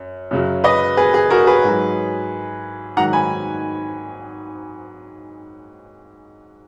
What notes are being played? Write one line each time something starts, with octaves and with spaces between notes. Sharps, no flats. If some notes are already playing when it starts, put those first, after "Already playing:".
Already playing: F#2
F#2 C#3 F#3
B4 D#5
G#4 B4
G#4
F#4 A#4
G#4 B4
G#2 F#3
G#2 D#3 F#3 F#5 A#5
G#5 B5